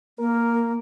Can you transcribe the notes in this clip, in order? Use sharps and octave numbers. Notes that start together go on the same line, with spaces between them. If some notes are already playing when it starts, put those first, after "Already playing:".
A#3 A#4